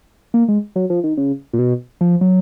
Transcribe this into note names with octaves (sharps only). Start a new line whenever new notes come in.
A#3
G#3
F#3
F3
D#3
C#3
A#2
B2
F3
F#3